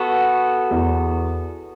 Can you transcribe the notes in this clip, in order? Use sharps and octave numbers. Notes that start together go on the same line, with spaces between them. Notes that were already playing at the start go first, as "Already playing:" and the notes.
Already playing: B3 F#4 A4
E2